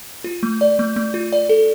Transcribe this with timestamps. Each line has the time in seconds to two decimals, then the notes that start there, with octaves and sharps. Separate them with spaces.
0.24 F4
0.43 A3
0.61 D5
0.79 A3
0.96 A3
1.14 F4
1.33 D5
1.49 A4